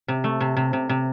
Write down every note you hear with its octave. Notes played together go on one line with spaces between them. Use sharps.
C3
A3
C3
C3
C3
C3